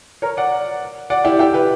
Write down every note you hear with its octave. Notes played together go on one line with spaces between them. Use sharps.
A#4 C#5
D5 F#5
D5 F#5
E4 G4
E4 G4
G4 B4